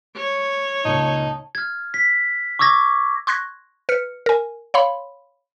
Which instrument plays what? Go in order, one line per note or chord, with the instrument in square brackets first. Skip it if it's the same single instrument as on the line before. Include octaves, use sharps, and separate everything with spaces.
[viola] C#5
[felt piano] C#2 A#2 [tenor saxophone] D#4 [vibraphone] A5
[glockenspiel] F6 G#6
B6
C#6 D6 E6 G#6 A#6
[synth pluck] C6 C#6 F#6 G#6 A#6
B4 F6 C#7
A#4 G#5
C#5 F5 B5 C6